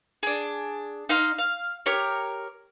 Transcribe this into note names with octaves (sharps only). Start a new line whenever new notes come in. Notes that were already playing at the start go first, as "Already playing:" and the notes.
D4 G#4
D#4 D#5 F5 C6
F5
G4 A#4 C#5